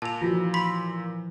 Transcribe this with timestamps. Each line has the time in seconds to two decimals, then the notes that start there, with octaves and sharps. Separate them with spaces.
0.02 A#2 A5 F7
0.22 E3 F3 F4 F#4
0.54 B5 C6 B6